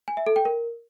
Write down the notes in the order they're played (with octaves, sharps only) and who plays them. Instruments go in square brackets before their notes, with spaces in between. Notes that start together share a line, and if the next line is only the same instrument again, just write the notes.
[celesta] G#5
E5
A4
G5
A#4